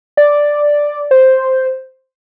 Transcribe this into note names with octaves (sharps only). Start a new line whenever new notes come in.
D5
C5